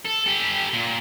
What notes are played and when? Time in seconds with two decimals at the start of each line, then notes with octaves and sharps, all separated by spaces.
0.05 A4
0.26 G4 A4
0.73 A#2